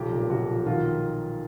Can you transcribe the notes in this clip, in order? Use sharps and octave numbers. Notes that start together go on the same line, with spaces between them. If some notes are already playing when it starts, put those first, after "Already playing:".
Already playing: B1 F3 G4
A#2
B1 F#4
F3
D#3 F4